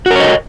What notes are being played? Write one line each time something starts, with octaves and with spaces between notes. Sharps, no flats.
F#4 A#4 C#5 D#5